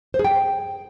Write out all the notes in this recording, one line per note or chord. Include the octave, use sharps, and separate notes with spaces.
C5
G#4
G5